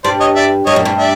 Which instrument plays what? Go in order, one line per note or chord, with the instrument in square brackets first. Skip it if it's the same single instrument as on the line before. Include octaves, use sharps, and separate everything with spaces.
[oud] G2 [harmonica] C5 D5
[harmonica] C#5 D#5
D5 E5
[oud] G2 [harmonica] C#5 D#5
[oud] F#2
G2
[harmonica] D5 E5